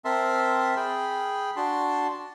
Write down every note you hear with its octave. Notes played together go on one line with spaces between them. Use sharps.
C4 A#4 E5 A5 C6
G#4 G5 B5
D4 F#4 A5 C6